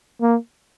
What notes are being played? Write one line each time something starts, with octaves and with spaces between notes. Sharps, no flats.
A#3